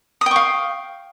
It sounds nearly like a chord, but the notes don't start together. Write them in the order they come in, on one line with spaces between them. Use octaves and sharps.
D#6 G5 C#6 F5